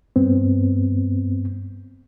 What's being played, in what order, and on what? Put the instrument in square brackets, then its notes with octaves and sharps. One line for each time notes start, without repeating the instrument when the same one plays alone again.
[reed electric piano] G2 B3 C4